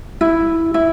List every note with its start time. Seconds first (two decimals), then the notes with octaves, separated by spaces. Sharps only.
0.21 E4
0.74 E4